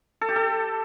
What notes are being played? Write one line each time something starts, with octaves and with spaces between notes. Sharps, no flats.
A4
G4
A4